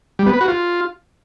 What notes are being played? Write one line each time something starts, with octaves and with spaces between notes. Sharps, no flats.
G3
B3
B4
F#4
F4